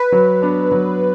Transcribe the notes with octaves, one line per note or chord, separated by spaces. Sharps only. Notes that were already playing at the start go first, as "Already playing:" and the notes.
Already playing: B4
F#3
B3 D4
F#3